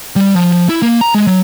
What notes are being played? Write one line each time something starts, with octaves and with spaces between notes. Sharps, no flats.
G3
F3
E4
A#3
A#5
G#3
F#3